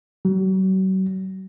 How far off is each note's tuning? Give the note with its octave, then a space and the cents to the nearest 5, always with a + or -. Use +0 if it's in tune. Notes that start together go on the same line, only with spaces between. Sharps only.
F#3 +40